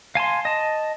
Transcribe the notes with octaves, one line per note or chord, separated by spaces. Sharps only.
F5 G#5 A5 C6
D#5 A5